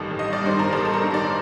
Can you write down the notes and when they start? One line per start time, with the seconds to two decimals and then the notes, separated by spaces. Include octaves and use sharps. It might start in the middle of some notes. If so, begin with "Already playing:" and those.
Already playing: A1 G2 D#3 A4
0.11 A1
0.19 D#5
0.33 D5
0.42 G2 D#3 C5
0.59 A#4
0.73 A1 A4
0.85 A4
0.93 A#4
1.04 G2 D#3
1.14 D5